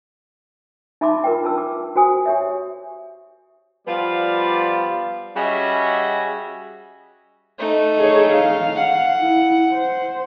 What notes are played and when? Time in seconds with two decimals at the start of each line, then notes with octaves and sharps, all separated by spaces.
1.01 D#4 E5 A5 B5 C6 D6
1.24 F4 A#4 B4 G5
1.43 D4 B4 A5 E6
1.58 D6
1.96 F#4 C5 G#5 D#6
2.26 G4 C#5 E5
3.88 F3 G3 B3 F4 D5
5.37 G3 C#4 F#4 G#4 D#5 E5
7.58 A3 D#4
7.98 G#4 C#5
8.31 F5
8.76 F#5
9.19 E4
9.71 C5